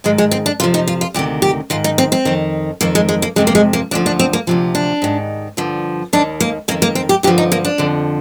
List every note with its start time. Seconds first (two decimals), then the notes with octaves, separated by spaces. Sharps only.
0.04 G#2 D#3 G#3
0.18 G#3
0.31 C4
0.46 D4
0.60 F2 C3 F3 F4
0.74 D#4
0.88 F4
1.01 F4
1.14 D2 C3 D#3 G4
1.42 G4
1.70 G#2 D#3 F4
1.84 D#4
1.98 C4
2.12 C4
2.25 F2 D#3
2.81 F2 D#3 A#3
2.95 G#3
3.09 G#3
3.22 A#3
3.36 F2 C3 F3 G#3
3.47 A#3
3.55 G#3
3.73 A#3
3.91 D2 D3 F3 D4
4.06 D4
4.19 C4
4.33 A#3
4.47 D2 C3 F3
4.75 D4
5.02 G#2 D#3
5.57 G2 D3 F3
6.13 D#2 D#3 D4
6.40 A#3
6.68 F2 A#3
6.71 D#3
6.82 A#3
6.95 C4
7.09 G4
7.23 G2 D3 F3 G4
7.38 D#4
7.52 A#3
7.65 D4
7.78 F2 D3 F3